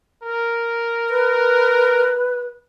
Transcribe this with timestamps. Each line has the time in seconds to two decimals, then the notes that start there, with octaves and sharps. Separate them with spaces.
0.23 A#4
1.09 B4